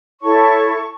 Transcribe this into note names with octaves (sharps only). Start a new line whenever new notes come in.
E4 A4 C#5 A5 C#6